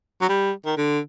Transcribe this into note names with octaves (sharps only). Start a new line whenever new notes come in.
F#3
G3
D#3
D3